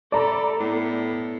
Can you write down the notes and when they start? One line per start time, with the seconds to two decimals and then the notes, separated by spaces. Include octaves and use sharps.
0.12 A3 A4 D5 A#5 B5
0.60 A2 B3